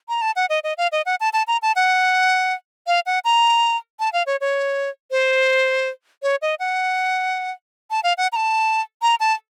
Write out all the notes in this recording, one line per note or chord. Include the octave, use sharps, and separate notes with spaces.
A#5
A5
F#5
D#5
D#5
F5
D#5
F#5
A5
A5
A#5
A5
F#5
F5
F#5
A#5
A5
F5
C#5
C#5
C5
C#5
D#5
F#5
A5
F5
F#5
A#5
A5
A#5
A5